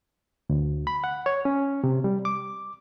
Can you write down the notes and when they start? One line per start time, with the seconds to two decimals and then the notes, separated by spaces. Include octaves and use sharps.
0.50 D2
0.87 B5
1.04 F#5
1.26 C#5
1.45 C#4
1.84 C3
2.04 G3
2.25 D6